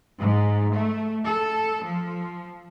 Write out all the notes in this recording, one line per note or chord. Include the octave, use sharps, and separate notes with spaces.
G#2
A3
A4
F3